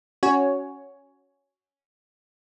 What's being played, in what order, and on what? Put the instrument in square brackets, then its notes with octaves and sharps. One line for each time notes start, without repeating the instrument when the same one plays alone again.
[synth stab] C#4 F#4 C#5 G#5